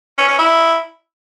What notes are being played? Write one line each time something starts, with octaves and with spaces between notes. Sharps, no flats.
C#4
C#4
E4